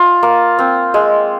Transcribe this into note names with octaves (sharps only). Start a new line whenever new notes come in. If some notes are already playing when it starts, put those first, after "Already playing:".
Already playing: F4
A#3
C4
G#3